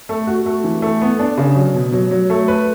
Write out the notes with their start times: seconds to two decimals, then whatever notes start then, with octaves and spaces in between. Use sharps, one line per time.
0.09 A3
0.27 F#4
0.46 A3
0.64 E3
0.82 A3
1.01 B3
1.19 D4
1.38 C#3
1.56 F#3
1.74 B2
1.92 F#3
2.11 F#3
2.30 A3
2.48 B4